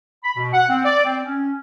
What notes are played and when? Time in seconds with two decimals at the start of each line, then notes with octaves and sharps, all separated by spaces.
0.24 B5
0.37 B2
0.53 F#5
0.69 C4
0.85 D5
1.06 C4
1.25 C#4